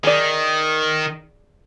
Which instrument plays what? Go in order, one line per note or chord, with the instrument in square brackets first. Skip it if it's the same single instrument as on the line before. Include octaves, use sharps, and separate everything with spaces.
[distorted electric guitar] D#3 [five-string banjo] G#4 D5